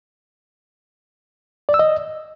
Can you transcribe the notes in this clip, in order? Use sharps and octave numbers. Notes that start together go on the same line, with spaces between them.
D5
E6
D#5